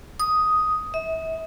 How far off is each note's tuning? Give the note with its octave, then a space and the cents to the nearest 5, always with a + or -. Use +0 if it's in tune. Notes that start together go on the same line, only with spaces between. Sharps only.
D#6 +5
E5 -35